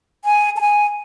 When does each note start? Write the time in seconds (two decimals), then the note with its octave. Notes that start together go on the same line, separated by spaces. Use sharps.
0.25 G#5
0.57 A5
0.61 G#5